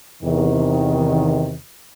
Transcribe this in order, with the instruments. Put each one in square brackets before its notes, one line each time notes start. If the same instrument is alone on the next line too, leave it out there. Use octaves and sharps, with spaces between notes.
[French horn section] E2 C3 D#3